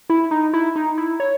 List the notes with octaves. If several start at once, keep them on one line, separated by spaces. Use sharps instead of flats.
E4
D#4
E4
D#4
E4
C#5